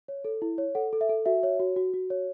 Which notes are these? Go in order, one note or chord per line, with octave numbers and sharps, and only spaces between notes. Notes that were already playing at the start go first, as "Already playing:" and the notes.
C#5
A4
E4
C#5
A4 F#5
A4
E5
A4
F#4 E5
C#5
F#4
F#4
F#4
C#5